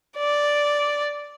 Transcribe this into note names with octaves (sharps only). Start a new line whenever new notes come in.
D5